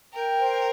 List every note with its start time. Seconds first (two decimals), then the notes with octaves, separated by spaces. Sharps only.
0.13 A#4 G5
0.40 C5